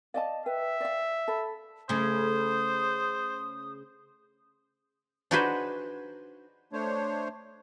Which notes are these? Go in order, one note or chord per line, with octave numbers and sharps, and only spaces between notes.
D5 D#5 F5 A5
B4 E5 G5
D5 F5
A4 A5 B5
C#3 A3 C5 D#6
D4 D#4 F#4 G#4 B4 C5
A3 D4 C5 C#5